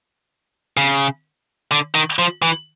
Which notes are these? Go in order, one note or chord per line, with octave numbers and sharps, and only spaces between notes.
C#3
D3
D#3
F3
E3